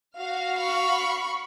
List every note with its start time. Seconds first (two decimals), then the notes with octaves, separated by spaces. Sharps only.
0.17 F#4 F5 F6
0.58 B5 C#6